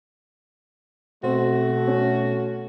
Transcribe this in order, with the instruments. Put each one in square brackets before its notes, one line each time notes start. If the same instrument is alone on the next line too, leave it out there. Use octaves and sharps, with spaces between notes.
[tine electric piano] B2 [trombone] A3 [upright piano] C4 [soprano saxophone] F#4
[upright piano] C#4